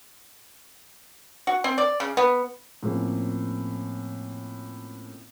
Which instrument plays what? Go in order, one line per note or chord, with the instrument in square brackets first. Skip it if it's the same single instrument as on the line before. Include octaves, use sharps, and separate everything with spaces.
[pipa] F#4
C4
D5
C#3
B3
[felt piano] A2 F3 A#3 C4 C#4